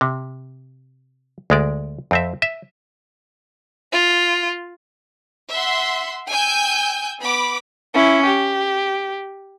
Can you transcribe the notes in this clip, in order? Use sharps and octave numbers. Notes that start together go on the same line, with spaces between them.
C3
D2 G#3 D5
F2 C4 E5
E5
F4
E5 F#5 C6
G5 G#5 E6 G6
B3 B5 D6
C#4 E4
G4